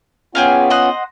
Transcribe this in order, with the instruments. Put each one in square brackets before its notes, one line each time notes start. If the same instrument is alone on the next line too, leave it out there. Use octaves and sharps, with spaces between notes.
[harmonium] B3 C#4 F4 [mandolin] G4 G#4 F5
[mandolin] C5 D#5 F#5